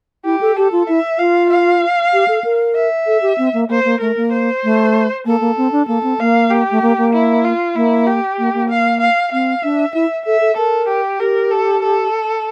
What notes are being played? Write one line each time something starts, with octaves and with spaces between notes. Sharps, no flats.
E4 G4
A4
G4 A4
F4
E4 E5
F4 F5
F5
G4
A4
A#4
E5
A4
G4
C4
A#3
A#3 C5
A#3
A3 A#4
A#3
C5
A3
A#3 A4
A#3
C4
D4
A#3 A4
C4
A#3 F5
G4
A3
A#3
A#3
E4
F4
A#3 E4
G4
A#3
A#3
F5
F5
C4 F5
D4 E5
E4 E5
A4 E5
A4
A4 A#4
G4
G4 A#4
A4
A4